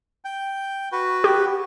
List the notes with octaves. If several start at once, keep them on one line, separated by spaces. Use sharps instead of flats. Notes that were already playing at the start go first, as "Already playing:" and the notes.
G5
F#4 B4
G4